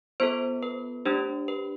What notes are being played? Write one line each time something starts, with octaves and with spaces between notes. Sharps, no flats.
B3 F4 A4 C5
B4
A3 D4 G4 C5
B4